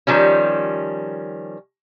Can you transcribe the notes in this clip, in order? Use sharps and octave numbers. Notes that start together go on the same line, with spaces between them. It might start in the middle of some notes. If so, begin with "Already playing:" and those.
D#3 F3 G3 C#4